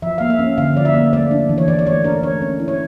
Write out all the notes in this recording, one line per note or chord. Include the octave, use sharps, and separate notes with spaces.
F3 E5
A#3 F5
E5
C#4
D3 F5
F3 D5
E5
A#3
A3 D5
D4
E3
C#5
E3 D5
D5
A3 C#5
D4 A#4
A3 C#5
C#4
E4
C#5